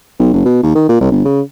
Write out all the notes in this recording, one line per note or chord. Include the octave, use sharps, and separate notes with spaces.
B1
F#1
B2
D#2
D#3
A#2
C2
G1
C#3